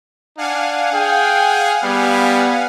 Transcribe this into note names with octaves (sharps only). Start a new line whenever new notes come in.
D4 F5 F#5 G#5
G#4 G5
G3 B3